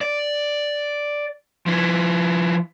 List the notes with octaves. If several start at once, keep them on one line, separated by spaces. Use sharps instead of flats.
D5
F3 E4